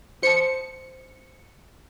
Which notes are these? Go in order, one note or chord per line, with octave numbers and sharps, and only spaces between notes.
C5 A5 C#7